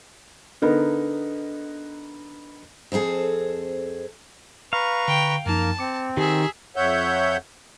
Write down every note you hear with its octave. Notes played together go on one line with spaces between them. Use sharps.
D3 B3 D#4 A#4
F2 C4 D#4 G#4 A4
B4 F5 A#5 C#6
D3 G5
F#2 F3 A#3 D#4 A#4 A5
C4 D6 C#7
D#3 G4 G#4 E5 A#5
F2 C#5 E5 F#5 G6